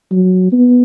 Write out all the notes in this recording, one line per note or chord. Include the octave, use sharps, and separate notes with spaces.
F#3
B3